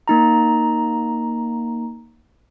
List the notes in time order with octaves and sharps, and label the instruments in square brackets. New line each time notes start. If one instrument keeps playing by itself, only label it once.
[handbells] A#3 D#4 A#5